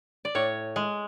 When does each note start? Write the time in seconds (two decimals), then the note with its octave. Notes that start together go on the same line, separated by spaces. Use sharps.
0.25 D5
0.35 A2 C#5
0.76 G#3